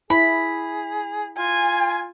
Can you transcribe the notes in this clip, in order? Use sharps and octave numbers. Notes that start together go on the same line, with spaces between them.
E4 G#4 B5
F4 G#5